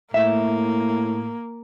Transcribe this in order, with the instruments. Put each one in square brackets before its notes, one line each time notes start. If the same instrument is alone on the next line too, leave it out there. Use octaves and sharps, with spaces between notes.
[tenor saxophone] A2 [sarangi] A#3 [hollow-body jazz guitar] E5